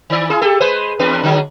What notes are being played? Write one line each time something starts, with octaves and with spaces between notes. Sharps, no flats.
D#3 D5
E4 G#4
G4 A4
G#3 B4 C5
E2 D4 B4
D3 F#3 G#3